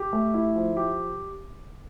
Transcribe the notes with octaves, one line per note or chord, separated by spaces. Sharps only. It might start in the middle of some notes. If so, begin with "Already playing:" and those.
Already playing: G4
A3
E4
F3
G4